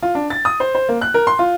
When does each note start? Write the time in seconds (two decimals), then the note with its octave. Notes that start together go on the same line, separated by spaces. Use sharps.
0.03 F4
0.15 D4
0.30 A6
0.45 D#6
0.60 C5
0.75 C5
0.89 A#3
1.02 F#6
1.14 A#4
1.27 C6
1.39 F4